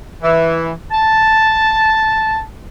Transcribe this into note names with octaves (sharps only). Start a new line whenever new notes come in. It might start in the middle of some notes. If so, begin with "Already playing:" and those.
E3
A5